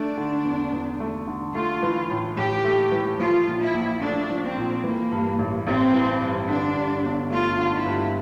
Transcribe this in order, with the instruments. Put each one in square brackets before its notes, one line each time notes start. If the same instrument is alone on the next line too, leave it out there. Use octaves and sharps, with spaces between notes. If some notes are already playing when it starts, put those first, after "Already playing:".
Already playing: [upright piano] A3 [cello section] D4
[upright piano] D3
E2
E2
A3
D3
[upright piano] A3 [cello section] F4
[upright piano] E3
A2
[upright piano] A2 [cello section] G4
[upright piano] A3
E3
[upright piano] F3 [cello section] F4
[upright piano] A#2
[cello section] E4
[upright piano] A#1
[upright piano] A3 [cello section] D4
[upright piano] F3
[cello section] C4
[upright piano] A#2
[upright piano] E3 [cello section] A#3
[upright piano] G2
A1
[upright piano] A1 [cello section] C4
[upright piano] E3
G2
[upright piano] D3 [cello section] D4
[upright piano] G2
G1
[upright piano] A3 [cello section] F4
[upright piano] D3
[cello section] E4
[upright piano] G2